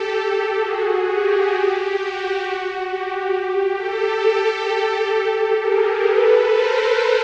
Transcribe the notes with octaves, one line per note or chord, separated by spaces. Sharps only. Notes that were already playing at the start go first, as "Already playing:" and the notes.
Already playing: G4 A4
G4 A4
F#4 G#4
G4
G4
F#4
F#4
G4
G4
G4 A4
G4 A4
G#4 A#4
A4 B4
A#4 C5